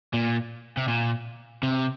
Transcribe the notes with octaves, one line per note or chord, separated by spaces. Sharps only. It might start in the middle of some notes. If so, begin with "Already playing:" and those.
A#2
C3
A#2
C3